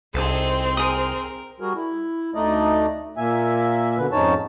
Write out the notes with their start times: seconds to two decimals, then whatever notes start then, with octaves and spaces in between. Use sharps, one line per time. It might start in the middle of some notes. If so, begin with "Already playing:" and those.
0.14 C2 C4 D#4 G#4 A4
0.77 G#4 A#4 D#6
1.60 G3 F#4 G#4 A#4
1.75 E4
2.35 D2 A3 D4 D#4 D5 D#5
3.17 A#2 A#3 E5 G#5
3.98 B2 D3 B4
4.12 F2 G#2 C#4 D#4 C#5 A5